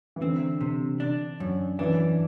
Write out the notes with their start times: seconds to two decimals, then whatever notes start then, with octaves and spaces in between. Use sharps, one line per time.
0.16 E3
0.22 D3 C4
0.61 C3
1.00 D4
1.40 F#2
1.79 E3 D4